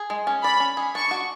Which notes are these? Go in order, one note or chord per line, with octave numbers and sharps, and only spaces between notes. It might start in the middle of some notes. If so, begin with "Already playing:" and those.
Already playing: G#4
G#3
C#4
D5 B5
C#4
G#4
D4 C#6
F#4